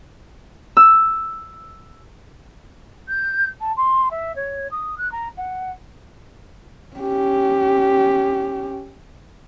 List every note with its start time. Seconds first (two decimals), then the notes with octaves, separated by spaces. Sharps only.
0.77 E6
3.08 G6
3.61 A5
3.77 C6
4.11 E5
4.36 C#5
4.71 D#6
4.98 F#6
5.12 A#5
5.37 F#5
6.96 C#4 G4